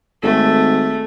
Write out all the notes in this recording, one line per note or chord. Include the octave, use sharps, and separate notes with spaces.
G#1 A3